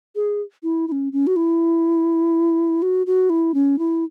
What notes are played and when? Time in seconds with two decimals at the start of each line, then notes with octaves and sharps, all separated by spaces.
0.16 G#4
0.63 E4
0.88 E4
0.92 C#4
1.13 C#4
1.27 F#4
1.36 E4
2.82 F#4
3.07 F#4
3.30 E4
3.54 C#4
3.79 E4